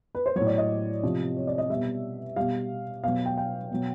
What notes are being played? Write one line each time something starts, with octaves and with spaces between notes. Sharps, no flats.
B4
C5
A2 F#3 C#5
D5
D#5
C3 F3
C#5
D5
D#5
B2 G3 E5
B2 G3 F5
B2 F#3 F5
G5
G5
B2 F#3